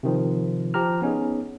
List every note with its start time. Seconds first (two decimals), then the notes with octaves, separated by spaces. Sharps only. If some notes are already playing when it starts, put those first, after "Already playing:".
0.03 C3 D#3 F3
0.74 F3 G4 A#5 F6
1.02 B3 C#4 D#4 G#4